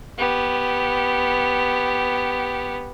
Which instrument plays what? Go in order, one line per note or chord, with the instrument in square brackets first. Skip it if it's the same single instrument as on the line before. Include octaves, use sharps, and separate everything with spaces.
[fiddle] B3 G4